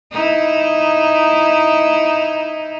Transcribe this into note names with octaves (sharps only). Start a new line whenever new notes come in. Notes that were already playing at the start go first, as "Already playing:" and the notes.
D#4 E4